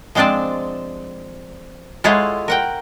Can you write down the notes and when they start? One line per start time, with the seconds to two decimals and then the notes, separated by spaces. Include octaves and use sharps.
0.15 F3 G#3 C4 D4 D5 A5
2.04 G#3 E4 F4 A4 C#5 F#5
2.48 A#4 F#5 G5